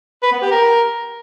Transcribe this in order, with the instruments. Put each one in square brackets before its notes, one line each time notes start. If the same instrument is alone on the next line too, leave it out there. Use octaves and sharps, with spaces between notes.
[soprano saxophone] B4
B3
G4
A#4